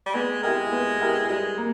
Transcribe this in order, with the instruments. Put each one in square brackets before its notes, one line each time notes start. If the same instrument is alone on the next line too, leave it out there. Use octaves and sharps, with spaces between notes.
[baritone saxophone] G3
[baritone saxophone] G#3 [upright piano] B3
[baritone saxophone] G#3 [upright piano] E4 G4 A#4
[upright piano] B3
E4 G4 A#4
[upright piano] G3 [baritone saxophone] G#3
[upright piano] A#3